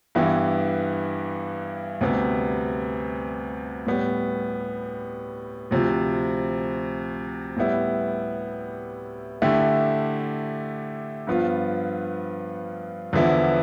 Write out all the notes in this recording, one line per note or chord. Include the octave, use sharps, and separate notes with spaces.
G2 E3 B3 E4 G4
D2 C3 G3 B3
A2 G3 B3
D2 C3 F3
A2 G3 B3 E4
D3 A3 E4 G4
G2 F3 B3 F4
E2 D3 F3 B3 E4